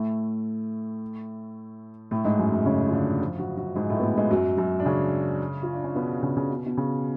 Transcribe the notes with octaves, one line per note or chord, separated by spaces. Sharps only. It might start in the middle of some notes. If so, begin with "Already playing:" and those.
Already playing: A2 A3
A2 A3
G#2 G#3
F#2 F#3
F#2 F#3
C#3 C#4
F4
D3 D4
F3 F4
F#3 F#4
F#3 F#4
G#2 G#3
A2 A3
B3
A2 A3
G#2 G#3
F#2 F#3
F#2 F#3
D4
C#3 C#4
F4
D4
C#4
B2 B3
C#3
C#3
B2
B2
C#3